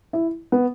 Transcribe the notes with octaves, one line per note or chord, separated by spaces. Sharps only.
E4
B3